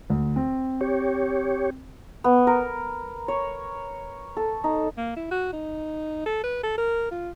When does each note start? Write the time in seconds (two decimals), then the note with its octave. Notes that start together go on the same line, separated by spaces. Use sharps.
0.10 D2
0.36 C4
0.81 G4 C#5
2.24 B3
2.47 A#4
3.28 C#5
4.37 A4
4.64 D#4
4.97 A#3
5.16 E4
5.31 F#4
5.53 D#4
6.26 A4
6.44 B4
6.63 A4
6.77 A#4
7.11 F4